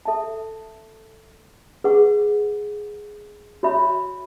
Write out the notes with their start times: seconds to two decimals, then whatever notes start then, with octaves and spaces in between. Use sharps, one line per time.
0.05 A4 E5 A5
1.84 G#4 B4 F#5 C#6
3.63 F#4 C#5 E5 B5